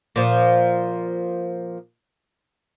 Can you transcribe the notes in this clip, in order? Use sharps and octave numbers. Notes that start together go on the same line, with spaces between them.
A#2 F3